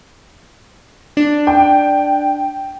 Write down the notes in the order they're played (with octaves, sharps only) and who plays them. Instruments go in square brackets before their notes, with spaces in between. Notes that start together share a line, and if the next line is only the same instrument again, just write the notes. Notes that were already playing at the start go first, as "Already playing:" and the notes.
[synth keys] D4
[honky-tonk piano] G5